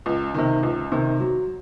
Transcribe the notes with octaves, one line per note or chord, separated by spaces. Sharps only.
C#2
C3 D#3
C#2
C3 D#3
F#3